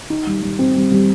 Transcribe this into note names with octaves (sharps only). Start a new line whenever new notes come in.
D#4
G3
G3
C4
G3
G3